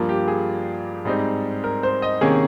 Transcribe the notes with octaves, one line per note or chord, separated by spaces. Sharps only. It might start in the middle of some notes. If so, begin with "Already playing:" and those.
Already playing: G2 F3 A#3 F4
G4
G#4
G#2 G3 C4 D#4
A#4
C5
D#5
C3 D#3 A#3 C#4 G#4